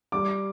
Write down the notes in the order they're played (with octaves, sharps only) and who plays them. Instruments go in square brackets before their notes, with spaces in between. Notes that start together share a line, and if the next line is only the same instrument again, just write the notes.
[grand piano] G3 D6